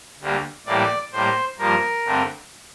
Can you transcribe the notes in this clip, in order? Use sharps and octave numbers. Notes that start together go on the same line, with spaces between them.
D2 D3 G3 A#3
A2 E3 G3 A#3 D5
A2 G3 A#3 C5
G2 F3 A#3 A#4
G2 D3 A3 C4